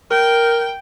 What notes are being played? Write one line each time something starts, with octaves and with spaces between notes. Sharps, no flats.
A#4 G5